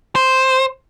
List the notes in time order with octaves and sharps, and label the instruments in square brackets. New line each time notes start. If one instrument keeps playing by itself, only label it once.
[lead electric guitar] C5